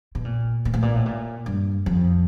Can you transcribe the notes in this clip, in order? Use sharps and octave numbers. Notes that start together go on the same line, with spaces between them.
B2
A#2
A#2
A2
A#2
A2
A#2
G2
F2